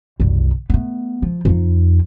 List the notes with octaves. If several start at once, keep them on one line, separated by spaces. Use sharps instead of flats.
F#1 C2
A3 B3
F3
F2 D#4